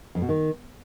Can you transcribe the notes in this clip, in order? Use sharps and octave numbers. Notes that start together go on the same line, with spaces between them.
F2
B2
D#3